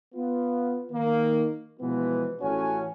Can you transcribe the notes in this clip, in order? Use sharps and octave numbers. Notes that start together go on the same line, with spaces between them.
B3 F4
D#3 A#3
B2 E3 F3 G#3 B3
A1 C#4 F#4 A4 C#5 G#5